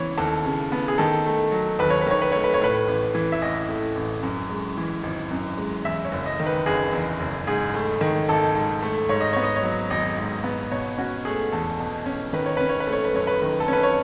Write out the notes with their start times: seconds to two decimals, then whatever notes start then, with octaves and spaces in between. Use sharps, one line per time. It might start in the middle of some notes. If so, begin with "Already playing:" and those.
Already playing: C#3 E3 B3 C#5
0.17 D#2 A4
0.45 C#3
0.72 B3
0.88 G#4
0.98 D#3 A4
1.26 A3
1.52 F#3
1.79 D#2 B4
1.90 C#5
2.01 B4
2.07 D#3 C#5
2.22 B4
2.32 A3 C#5
2.44 B4
2.54 C#5
2.61 A2 B4
2.88 A1
3.15 E3
3.32 E5
3.42 A1 D#5
3.68 A2
3.95 A1
4.23 F#2
4.50 G#3
4.77 E3
5.03 G#1
5.31 F#2
5.57 G#3
5.85 E2 E5
6.05 C#5
6.12 F#1
6.26 D#5
6.40 D#3
6.46 B4
6.66 F#1 G#4
6.93 E2
7.20 F#1
7.47 G#2 G#4
7.74 A3
8.01 D#3
8.28 G#1 A4
8.55 G#2
8.83 A3
9.09 G#2 C#5
9.21 D#5
9.33 B3 C#5
9.43 D#5
9.56 C#5
9.63 F#3
9.90 G#1 D#5
10.18 G#2
10.44 B3
10.71 B2 C#5
10.98 C#4 F#4
11.25 A3 G#4
11.52 E2 A4
11.80 B2
12.06 C#4
12.33 D#3 B4
12.46 C#5
12.57 C#4 B4
12.69 C#5
12.80 B4
12.87 A3
12.93 C#5
13.05 B4
13.14 F#2 C#5
13.27 B4
13.42 D#3
13.60 A4
13.68 C#4 B4
13.83 C#5